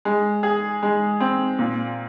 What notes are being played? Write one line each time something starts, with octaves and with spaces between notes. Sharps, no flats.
G#3
G#4
G#3
C4
A#2